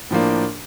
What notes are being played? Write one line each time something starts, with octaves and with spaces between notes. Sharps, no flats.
A2 F3 A#3 D4